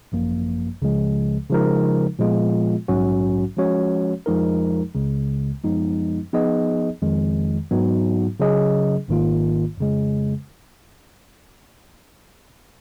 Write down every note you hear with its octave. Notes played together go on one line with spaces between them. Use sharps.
G#1 F#2 F3 A#3
C#2 C#3 F3 G#3
C#3 F3 G#3 D#4 A#4
A#2 F3 G#3 B3 F4
A#1 G#2 F#3 C#4 F#4
F3 G#3 C#4 F#4 C#5
F2 F3 G#3 D#4 A#4
C#2 C#3 G#3
F#2 F3 G#3 B3 D#4
F3 B3 D#4 G#4 D#5
F2 D#3 G#3
G#2 F#3 B3 D#4 F#4
C#3 F#3 C#4 G#4 D#5
G#1 G#2 D#3 A#3 F4
F2 C#3 G#3